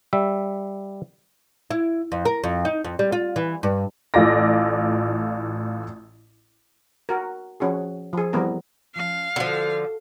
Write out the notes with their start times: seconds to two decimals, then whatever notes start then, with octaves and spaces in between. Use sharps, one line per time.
0.13 G3 E5
1.70 E4
2.12 F2
2.25 A#4
2.44 F2
2.65 D#4
2.85 F2
2.99 G3
3.12 F4
3.36 E3
3.63 G2
4.14 A1 A2 F4 D5 A#6
7.09 F#4 A#4
7.60 F3 C#4 F#4 G#4
8.13 F3 G#4
8.33 E3 F3 G3 B3 C4 A#4
8.95 F3 C#4 F5
9.36 D3 F3 F#4 A4 C5